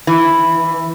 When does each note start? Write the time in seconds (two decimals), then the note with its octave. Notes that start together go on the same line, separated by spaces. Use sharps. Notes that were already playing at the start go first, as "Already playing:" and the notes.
0.07 E3